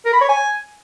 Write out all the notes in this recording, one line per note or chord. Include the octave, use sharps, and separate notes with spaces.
A#4
B5
C#5
G#5